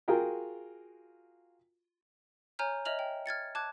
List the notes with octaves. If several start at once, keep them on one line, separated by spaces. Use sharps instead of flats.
F4 F#4 G#4 A#4 G5
C#5 G#5 A#5 F6 G6
C#5 D#5 E5 F6 F7 F#7
G5
F6 G#6 A6 C#7
A5 D6 F#6 G#6